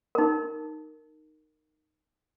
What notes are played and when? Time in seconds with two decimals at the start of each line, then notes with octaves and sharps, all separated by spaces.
0.15 D#4 A#4